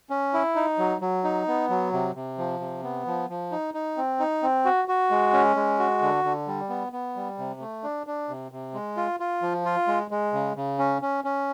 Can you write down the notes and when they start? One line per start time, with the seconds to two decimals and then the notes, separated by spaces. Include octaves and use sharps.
0.10 C#4
0.34 E4
0.56 D#4
0.78 F#3
1.01 F#3
1.24 D#4
1.48 B3
1.70 F#3
1.93 C3
2.15 C3
2.38 F3
2.60 C3
2.83 B3
3.07 F3
3.29 F3
3.52 D#4
3.74 D#4
3.97 C4
4.20 D#4
4.43 C4
4.65 F#4
4.88 F#4
5.11 G#3
5.34 C#4
5.56 G#3
5.79 F#4
6.02 D3
6.24 D3
6.47 G3
6.69 B3
6.92 B3
7.16 G3
7.38 C3
7.60 A3
7.83 D4
8.07 D4
8.29 C3
8.52 C3
8.74 G#3
8.97 F4
9.20 F4
9.42 F3
9.65 F4
9.87 G#3
10.11 G#3
10.33 C#3
10.56 C#3
10.79 C#4
11.02 C#4
11.24 C#4